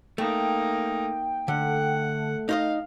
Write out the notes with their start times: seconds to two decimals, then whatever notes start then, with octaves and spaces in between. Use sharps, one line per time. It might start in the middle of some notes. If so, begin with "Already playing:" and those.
0.18 A3 A#3 D#4 G5
1.48 D3 A3 A4 F#5
2.49 D#4 C5 D#5 F5